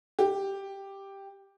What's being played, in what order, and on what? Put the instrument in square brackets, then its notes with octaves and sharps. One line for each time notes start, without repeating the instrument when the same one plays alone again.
[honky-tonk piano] G4